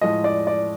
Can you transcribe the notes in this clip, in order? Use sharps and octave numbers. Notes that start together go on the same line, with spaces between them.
A2 F3 G#3 D#5
D5
D5